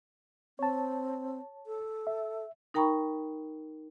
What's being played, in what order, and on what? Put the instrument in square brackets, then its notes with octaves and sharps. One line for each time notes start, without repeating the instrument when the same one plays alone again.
[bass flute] C4 [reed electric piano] C#5 A5
[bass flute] A4
[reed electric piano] E5
[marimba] D#4 A#4 G5 A#5 B5 C#6